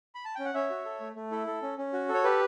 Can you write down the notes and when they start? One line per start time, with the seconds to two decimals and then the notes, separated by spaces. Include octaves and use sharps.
0.15 B5
0.25 A5
0.35 C#4 G5
0.45 F#5
0.54 C#4 C#5 E5
0.70 F#4
0.85 A4
1.00 A3
1.16 A3
1.31 E4 A4
1.47 A4
1.62 C#4
1.78 C#4
1.93 F#4
2.09 A4
2.14 C#5
2.24 G4 B4